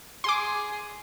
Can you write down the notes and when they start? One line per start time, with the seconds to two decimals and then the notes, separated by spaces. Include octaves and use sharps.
0.24 G#4 C6 D6